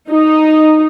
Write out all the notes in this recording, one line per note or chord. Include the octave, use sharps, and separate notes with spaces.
D#4